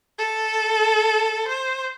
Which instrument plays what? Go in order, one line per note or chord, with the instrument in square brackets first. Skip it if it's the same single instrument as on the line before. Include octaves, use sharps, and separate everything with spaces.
[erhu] A4
C5